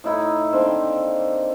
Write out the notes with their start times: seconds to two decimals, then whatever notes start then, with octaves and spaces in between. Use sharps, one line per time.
0.04 A2 D#4 E4 B5
0.53 D3 D#3 A#3 C4